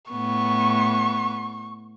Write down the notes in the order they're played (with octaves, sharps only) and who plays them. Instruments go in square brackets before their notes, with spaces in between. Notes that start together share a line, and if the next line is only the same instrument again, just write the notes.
[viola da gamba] A2 B3 [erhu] C#6